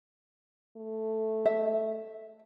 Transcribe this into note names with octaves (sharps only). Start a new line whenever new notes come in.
A3
E5